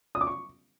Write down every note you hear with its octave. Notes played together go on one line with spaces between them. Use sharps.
D#6
D6
C#6